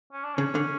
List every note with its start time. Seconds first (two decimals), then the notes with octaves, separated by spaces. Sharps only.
0.12 C#4
0.24 D4
0.34 C#3 C#4
0.55 D3